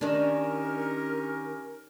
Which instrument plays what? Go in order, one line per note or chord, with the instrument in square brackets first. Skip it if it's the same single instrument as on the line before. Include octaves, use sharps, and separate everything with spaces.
[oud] D#3 D4 [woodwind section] C#4 G4 A#4